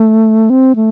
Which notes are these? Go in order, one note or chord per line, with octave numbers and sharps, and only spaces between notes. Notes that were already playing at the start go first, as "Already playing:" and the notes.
Already playing: A3
C4
A3